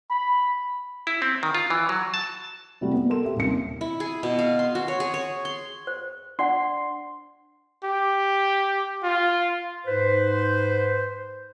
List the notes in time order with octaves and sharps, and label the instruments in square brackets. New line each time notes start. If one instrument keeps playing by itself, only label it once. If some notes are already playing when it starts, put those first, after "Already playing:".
[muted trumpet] B5
[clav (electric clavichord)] E4
C4
D#3
F4
E3
F#3
A5
[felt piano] C3 G3 A3 E4 F#4
B3
A4 A#4 C6 E7
G4 E5
D#1 D#2 C3 C#4 C#7
[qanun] E4
G#4
B2
F5
C6
F#4
C#5
G#4
C#5
C6
[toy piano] C5
[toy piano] D4 D5 F#5 [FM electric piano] C6
[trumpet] G4
F4
[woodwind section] G#2 B4 C5